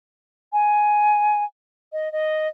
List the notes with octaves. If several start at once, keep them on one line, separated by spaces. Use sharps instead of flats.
G#5
D#5
D#5